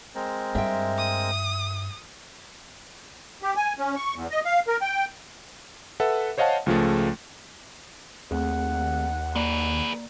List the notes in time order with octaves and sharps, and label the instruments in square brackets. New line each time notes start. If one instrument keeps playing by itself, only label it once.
[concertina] G#3 C4 A#4
[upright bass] G2 [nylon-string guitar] E5 G5
[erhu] D#6
[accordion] G4
G#5
C#4
C#6
E2
D#5
F5
A#4
G5
[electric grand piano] A4 B4 E5 F#5
C5 C#5 D#5 F5 F#5 A5
C#2 F3 G#3 A3
[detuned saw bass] D#2 [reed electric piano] A3 C4 G#4 [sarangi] F#5
[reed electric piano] A#3 D5 A#5 [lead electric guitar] G#4 B4